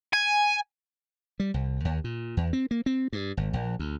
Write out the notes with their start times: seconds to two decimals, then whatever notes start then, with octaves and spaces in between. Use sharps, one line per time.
0.13 G#5
1.40 G3
1.54 C2
1.85 D#2
2.04 A#2
2.37 E2
2.53 C4
2.71 A#3
2.86 C4
3.13 G2
3.37 G#1
3.53 A#1
3.79 D2